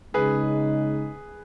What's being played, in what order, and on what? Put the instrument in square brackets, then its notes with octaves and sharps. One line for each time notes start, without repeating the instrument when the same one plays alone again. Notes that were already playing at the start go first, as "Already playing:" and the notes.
[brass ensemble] C#3 G#3 D#4 [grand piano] G#4 B4